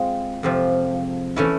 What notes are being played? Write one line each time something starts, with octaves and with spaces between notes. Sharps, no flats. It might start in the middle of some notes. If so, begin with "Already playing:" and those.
Already playing: G#3 C4 F4 G#4
F2 C3 F3
E3 A3 C#4 E4